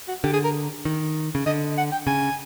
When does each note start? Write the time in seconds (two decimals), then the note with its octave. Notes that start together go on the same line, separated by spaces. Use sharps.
0.08 F#4
0.24 D3 G4
0.33 G#4
0.44 A#4
0.85 D#3
1.35 C#3
1.46 D3 D#5
1.77 F#5
1.92 G5
2.07 C#3 G#5